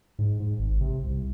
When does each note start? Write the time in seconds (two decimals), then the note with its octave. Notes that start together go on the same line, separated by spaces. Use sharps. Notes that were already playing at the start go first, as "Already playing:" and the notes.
0.19 G#2
0.40 G#2
0.59 G#1
0.81 C3
1.04 C2